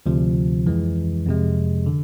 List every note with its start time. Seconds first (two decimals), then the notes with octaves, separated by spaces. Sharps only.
0.06 D2 C3 F3
0.66 F2 E3 G#3
1.26 F2 C3 G#3
1.86 D3